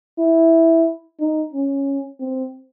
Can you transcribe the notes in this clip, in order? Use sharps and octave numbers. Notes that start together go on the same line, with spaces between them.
E4
D#4
C#4
C4